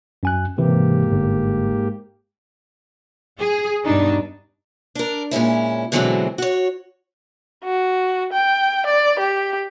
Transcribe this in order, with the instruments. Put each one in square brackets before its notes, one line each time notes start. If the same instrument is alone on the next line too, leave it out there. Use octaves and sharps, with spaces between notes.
[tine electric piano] F#2 G#5 F#6
[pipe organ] G#2 A#3 G4 [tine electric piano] C3 E3
[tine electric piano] G1
[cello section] G#4
G2 B2 D4 D#4
[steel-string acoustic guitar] D4 A#4
A#2 G#3 C#4 E4
B2 D3 E3 F#3 G#3 C4
F#4 C#5
[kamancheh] F#4
G5
D5
G4